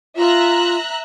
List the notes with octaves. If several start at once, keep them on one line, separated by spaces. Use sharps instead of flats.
F4 E5 A#5 F#6